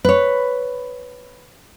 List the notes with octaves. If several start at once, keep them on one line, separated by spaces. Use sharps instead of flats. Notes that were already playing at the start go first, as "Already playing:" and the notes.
B4 C#5